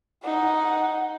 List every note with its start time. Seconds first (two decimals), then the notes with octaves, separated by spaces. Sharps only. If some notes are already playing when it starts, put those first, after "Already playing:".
0.24 D#4 F#5